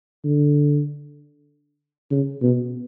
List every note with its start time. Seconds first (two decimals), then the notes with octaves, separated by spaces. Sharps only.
0.24 D3
2.11 C#3
2.42 B2